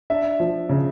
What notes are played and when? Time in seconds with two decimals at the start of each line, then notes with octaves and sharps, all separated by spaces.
0.10 D4 E5
0.40 F3
0.69 C#3